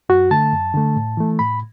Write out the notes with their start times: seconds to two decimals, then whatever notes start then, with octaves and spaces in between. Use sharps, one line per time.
0.09 F#2 F#4
0.31 D3 A3 A5
0.53 F#2
0.74 D3 A3
0.96 A2
1.17 E3 A3
1.39 A2 B5